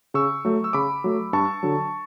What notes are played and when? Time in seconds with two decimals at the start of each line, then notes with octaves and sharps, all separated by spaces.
0.14 C#3 C#6 E6
0.45 F#3 A3
0.64 E6
0.73 C#3 B5 D6
1.04 F#3 A3
1.33 G2 A5 C#6
1.63 D3 F#3